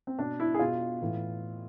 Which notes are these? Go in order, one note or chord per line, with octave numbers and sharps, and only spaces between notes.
C4
B2 D4
E4
G#4
B2 F4
A2 E3